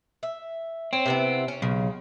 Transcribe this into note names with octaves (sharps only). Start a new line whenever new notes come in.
E5
C4 C#5
C3 B3 E4
C#4
B1 C#3